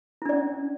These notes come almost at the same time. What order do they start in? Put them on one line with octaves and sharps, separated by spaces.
E4 D4 D5 C#4